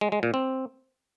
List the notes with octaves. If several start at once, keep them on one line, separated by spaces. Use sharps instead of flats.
G#3
G#3
A#2
C4